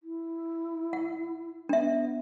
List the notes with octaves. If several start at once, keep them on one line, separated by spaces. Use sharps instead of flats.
E4
F#5
B3 D4 E5